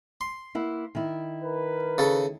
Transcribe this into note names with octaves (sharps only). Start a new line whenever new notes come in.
C6
A#3 E4 F#5
D#3 E4
A#4 B4
C#3 A4